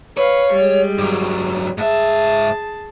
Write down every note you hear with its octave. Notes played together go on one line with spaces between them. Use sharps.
B4 C#5 F5
G3 G#3
G2 F#3
G#2 G#4 E5 A5